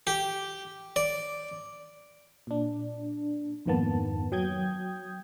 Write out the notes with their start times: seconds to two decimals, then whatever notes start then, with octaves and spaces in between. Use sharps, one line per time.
0.07 G4
0.96 D5
2.47 A#2 D4
3.66 F2 G#2 D#3 A#3 B3 A5
4.32 F#3 G5 D#6 G6 G#6